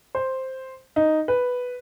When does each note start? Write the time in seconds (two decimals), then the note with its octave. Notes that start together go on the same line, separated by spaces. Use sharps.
0.15 C5
0.96 D#4
1.28 B4